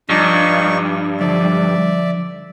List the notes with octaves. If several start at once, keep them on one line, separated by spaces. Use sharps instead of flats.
G2 F3 D4 D#4 C#6
D3 F3 F#3 D5 E5